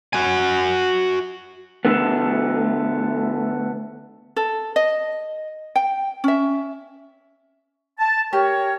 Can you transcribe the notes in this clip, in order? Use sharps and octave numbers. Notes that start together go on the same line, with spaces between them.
F#4 G#5
D3 A3 B3
A4
D#5
G5
C#4 E5
A5
G4 A#4 C#5